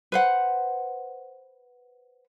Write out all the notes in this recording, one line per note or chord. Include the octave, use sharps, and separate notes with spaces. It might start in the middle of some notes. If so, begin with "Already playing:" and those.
B4 C5 F#5